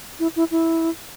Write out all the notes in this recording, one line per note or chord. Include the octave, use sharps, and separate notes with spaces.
E4
E4
E4